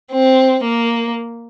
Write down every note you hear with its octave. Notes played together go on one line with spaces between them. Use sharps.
C4
A#3